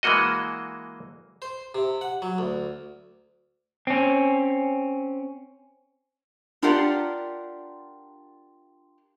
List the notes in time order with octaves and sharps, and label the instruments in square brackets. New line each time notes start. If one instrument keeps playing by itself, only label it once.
[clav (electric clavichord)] E3 G#3 A#3 F#4 D#5
[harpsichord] C5
C3
F#5
F#3
D2
[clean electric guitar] C4 C#4
[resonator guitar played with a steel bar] D4 F4 G4 A#4 D5 F#5